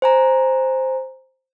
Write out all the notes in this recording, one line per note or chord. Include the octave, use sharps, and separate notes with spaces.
C5 G#5 A#5